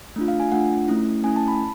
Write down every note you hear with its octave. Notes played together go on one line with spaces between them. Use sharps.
A3 D4 F4
F5
G#5
A3 D4 F4 F#5
A3 C#4 E4
A3 C#4 E4 G#5
A5
B5